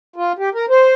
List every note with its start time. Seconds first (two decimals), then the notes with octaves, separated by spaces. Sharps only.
0.16 F4
0.39 G4
0.55 A#4
0.70 C5